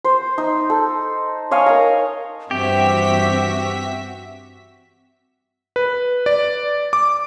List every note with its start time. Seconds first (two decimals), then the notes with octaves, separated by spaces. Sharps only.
0.04 C5
0.38 D#4
0.70 A4
1.51 C#5 D#5 F5 G#5
1.66 A#4 A#5
2.51 G2 E3 C4 F#4 G4 E5 B6
5.76 B4
6.26 D5
6.93 D6